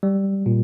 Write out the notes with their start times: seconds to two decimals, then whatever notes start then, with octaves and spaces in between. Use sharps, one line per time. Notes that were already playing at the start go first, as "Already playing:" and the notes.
0.03 G3
0.46 A#2